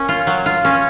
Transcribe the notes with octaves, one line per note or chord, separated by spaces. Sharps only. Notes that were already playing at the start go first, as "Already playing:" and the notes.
Already playing: A#3 C#4
F4
F#3
F4
C#4